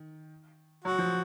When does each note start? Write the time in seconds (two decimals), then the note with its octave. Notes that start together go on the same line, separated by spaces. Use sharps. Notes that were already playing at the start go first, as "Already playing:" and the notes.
Already playing: D#3
0.84 F#3 F#4
0.98 F3